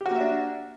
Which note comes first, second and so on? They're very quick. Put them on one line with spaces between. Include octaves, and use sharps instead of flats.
G4 F#4 A#3 E5 D4